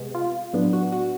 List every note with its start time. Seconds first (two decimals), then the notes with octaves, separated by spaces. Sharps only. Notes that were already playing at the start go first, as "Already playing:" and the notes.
Already playing: C3 G#3 B3
0.15 F4
0.53 A2 F#3 B3 D4
0.73 F#4
0.92 F#4